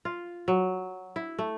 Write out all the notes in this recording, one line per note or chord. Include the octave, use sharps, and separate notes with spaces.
F4
F#3
E4
A3